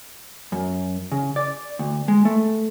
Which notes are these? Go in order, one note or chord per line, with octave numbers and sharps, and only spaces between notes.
F#2
C#3
D5
D2
G#3
A3